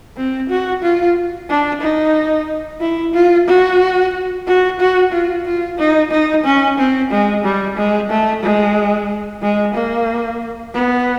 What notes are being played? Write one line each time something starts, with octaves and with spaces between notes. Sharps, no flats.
C4
F#4
F4
D4
D#4
E4
F4
F#4
F#4
F#4
F4
F4
D#4
D#4
C#4
C4
G#3
G3
G#3
A3
G#3
G#3
A#3
B3